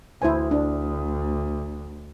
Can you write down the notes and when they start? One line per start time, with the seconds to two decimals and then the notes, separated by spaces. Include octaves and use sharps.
0.22 D2 E4 C5 G#5
0.51 D4